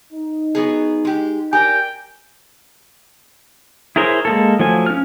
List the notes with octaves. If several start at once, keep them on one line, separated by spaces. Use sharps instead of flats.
D#4
F#3 B3 G#4
G#3 G4
G4 A#4 D5 G5 G#5
E4 G#4 A#4 C5 C#5
G#3 A#3 A4
F3 F#3 A3 G#5
C#4 F6